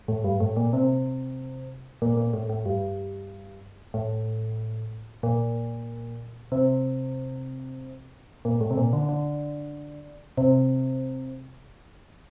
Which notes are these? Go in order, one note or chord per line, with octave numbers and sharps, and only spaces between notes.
A2
G2
A2
A#2
C3
A#2
A#2
A2
A2
G2
A2
A#2
C3
A#2
A2
C3
A#2
D3
D3
C3